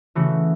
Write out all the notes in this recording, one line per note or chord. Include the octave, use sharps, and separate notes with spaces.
C#3 E3 A3 F#4